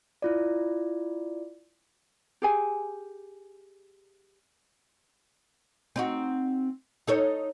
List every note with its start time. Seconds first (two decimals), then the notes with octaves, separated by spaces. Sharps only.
0.22 E4 F4 D5
2.42 G4 G#4 G#5
5.96 C4 D#4 F#4
7.07 D#4 A4 C#5